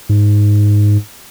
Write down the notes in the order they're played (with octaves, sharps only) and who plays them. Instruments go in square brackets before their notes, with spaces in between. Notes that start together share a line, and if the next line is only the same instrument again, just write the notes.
[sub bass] G#2